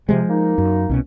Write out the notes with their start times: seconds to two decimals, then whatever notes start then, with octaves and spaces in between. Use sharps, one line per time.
0.09 C3 F3 F#3 G#3
0.29 A#3 D#4
0.58 F#2
0.89 C2 B2 C#4